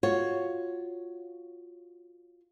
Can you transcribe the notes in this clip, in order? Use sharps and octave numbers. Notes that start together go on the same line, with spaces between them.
F4 F#4 C#5